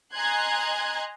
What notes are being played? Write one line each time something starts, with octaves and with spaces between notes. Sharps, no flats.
D#5 G#5 A#5 C6 F#6 G#6